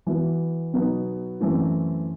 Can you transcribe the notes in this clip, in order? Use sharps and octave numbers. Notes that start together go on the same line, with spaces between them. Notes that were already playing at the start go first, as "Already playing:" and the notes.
E3 B3 F#4
B2 F#3 B3 D#4
F#2 E3 A3 C4 E4